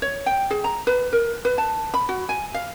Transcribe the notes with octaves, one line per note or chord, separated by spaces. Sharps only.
C#5
G5
G#4
A#5
B4
A#4
B4
A5
B5
F#4
G#5
F5